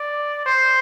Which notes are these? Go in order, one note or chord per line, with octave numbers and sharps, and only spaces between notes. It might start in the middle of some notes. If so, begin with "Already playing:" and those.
Already playing: D5
C5